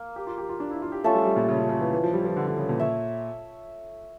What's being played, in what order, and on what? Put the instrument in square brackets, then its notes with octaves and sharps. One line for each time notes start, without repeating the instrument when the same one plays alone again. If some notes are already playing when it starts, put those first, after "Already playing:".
Already playing: [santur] A#3
[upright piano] G4
F4
G4
F4
D4
E4
F4
G4
[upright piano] A3 [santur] C#4 F4 A4 E5
[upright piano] G3
G3
A#2
C#3
C#3
C#3
E3
E3
F3
G3
F3
D3
D3
C#3
A#2
[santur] C#5 E5